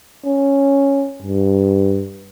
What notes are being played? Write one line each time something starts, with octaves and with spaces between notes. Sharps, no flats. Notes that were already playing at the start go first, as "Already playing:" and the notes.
C#4
G2